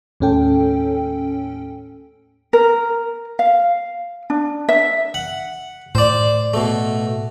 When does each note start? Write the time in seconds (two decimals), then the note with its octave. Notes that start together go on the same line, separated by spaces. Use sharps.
0.20 D#2 A2 C#4 A4 G5
2.53 A#4
3.39 F5
4.30 D4
4.69 E5
5.14 F#5
5.95 A2 C5 D5
6.54 B2 A3